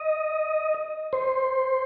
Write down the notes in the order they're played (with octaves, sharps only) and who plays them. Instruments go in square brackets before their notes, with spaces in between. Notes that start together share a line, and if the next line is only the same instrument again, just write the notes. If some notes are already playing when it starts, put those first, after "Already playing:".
Already playing: [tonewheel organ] D#5
C5